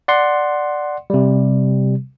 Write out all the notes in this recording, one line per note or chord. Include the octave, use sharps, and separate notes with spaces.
D5 F#5 C6
C3 G3